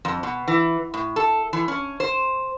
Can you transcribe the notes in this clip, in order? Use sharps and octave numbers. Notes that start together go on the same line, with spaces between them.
F2
B2
E3
A2
A4
E3
C#4
C5